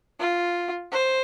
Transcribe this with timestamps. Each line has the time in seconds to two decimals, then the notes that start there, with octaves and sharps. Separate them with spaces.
0.20 F4
0.92 C5